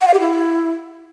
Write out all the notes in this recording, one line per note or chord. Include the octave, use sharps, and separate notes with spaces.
F#5
F5
G4
E4